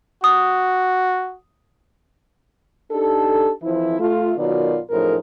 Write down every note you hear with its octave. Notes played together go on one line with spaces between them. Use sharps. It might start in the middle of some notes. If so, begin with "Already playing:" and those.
F#4 D#6
D4 D#4 G4 A4
F2 E3 F3 E4
A3 F4
B2 D#3 F#3 F4 A#4 D5
F#2 A2 F3 D#4 G#4 A#4